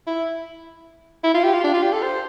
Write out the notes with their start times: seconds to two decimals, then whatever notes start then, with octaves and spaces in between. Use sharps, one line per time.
0.07 E4
1.24 E4
1.34 F4
1.44 G4
1.54 F4
1.64 D4
1.73 F4
1.83 G4
1.93 A4
2.03 C5